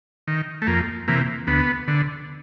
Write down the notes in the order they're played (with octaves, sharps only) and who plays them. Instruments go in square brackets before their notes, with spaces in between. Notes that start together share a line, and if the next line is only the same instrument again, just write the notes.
[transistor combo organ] D#3
A3
F2 A#3
C3 E3 A#3
D2 B3
D3